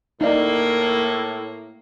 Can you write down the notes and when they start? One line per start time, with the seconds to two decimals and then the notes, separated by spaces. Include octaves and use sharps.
0.21 A2 A#3 D#4 D5